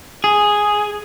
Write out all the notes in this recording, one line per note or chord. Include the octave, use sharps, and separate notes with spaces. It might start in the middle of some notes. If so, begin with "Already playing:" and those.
G#4